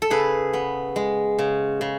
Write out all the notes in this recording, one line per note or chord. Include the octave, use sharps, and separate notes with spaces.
A4
C#3 G#4 B4
B3
G#3
C#3
C#3